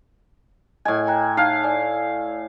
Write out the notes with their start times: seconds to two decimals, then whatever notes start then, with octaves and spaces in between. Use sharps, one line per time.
0.85 A2 D#5 G#5
1.07 G5 A#5 F#6
1.37 D#4 F5 A5 F#6
1.64 D5 G#5